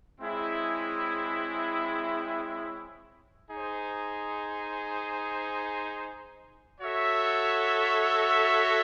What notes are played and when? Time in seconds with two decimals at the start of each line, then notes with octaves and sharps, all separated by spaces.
0.18 G#3 C4 E4 G#4 C#5
3.49 D#4 G#4 C5
6.80 F#4 A4 C#5 E5